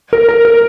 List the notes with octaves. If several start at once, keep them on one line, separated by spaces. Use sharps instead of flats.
A#4
A#4
A#4